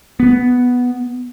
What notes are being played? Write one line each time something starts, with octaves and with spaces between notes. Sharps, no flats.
B3